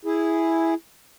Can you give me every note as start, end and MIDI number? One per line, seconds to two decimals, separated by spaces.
0.05 0.74 64
0.05 0.74 68